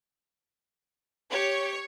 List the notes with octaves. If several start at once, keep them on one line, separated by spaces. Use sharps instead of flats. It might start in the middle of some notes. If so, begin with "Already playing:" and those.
G4 C#5